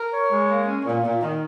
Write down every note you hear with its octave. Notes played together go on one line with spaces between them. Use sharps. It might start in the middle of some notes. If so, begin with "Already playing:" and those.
Already playing: A#4
C#5
G#3
A#3
C#4
A#2
A#2
D#3